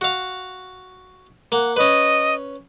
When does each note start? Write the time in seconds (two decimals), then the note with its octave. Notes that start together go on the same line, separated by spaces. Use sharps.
0.01 F#4 F5
1.52 A#3 F#5
1.77 C#4 B4 D#5